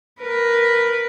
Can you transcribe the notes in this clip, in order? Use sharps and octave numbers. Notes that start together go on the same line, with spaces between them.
A#4 B4